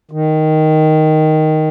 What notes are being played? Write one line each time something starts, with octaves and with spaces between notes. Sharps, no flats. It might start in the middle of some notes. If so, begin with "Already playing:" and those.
D#3